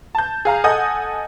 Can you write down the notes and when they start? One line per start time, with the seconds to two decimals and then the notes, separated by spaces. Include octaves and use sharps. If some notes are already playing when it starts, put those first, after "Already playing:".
0.15 A5 G6
0.45 G#4 F5 A#5
0.64 A4 D#5 F#5 G#5 D#6 G6